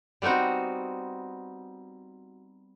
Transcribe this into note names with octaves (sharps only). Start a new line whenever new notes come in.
G3 B3 C4 D#4 F#4